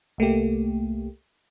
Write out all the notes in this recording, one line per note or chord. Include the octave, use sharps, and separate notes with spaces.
C2 A3 A#3 G4